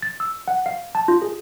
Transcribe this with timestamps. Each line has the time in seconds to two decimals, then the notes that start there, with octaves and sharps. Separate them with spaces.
0.02 A6
0.20 E6
0.48 F#5
0.66 F5
0.95 A5
1.08 F4
1.22 G#4